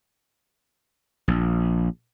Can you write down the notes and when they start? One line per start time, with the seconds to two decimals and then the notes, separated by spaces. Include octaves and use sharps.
1.28 A#1